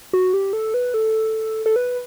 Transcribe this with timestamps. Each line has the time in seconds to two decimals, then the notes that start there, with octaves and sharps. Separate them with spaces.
0.13 F#4
0.34 G4
0.53 A4
0.74 B4
0.94 A4
1.66 A4
1.76 B4